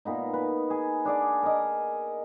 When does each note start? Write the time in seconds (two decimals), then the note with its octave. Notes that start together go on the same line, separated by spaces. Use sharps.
0.05 A#2 B3 D#4
0.33 B4
0.70 G#4
1.05 D4 G#4 D5
1.43 A#4 D#5